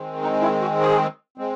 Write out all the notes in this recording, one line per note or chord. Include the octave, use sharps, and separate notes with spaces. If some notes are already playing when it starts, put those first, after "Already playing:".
Already playing: D#3 G#3 C4
D#4
E4
F#4
G#4
G#3 C4